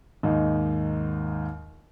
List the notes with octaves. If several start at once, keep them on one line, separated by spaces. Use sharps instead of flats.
D#2 G#2 D#4